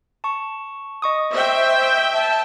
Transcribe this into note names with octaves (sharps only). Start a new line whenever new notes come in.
A5 C#6
D#5 C#6 D#6
C5 E5 G5
A5